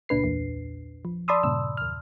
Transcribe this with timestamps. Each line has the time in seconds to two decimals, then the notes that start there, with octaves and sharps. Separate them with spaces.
0.09 C#2 A#2 D4 B4 C7
0.23 A#1 E2 A#2
1.05 F3
1.28 D5 A5 B5 C6 D#6 E6
1.43 G2 A#2 C#3 E6
1.77 E2 F6